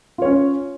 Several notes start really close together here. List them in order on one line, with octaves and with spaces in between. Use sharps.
F4 C#5 C#4